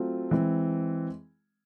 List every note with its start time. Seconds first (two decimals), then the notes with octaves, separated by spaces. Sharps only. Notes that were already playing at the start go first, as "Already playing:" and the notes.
Already playing: F#3 A3 C4 F4
0.31 E3 G#3 C4